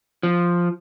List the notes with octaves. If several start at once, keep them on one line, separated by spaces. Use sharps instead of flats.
F3